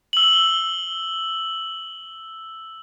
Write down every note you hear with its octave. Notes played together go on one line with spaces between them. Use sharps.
E6 F#7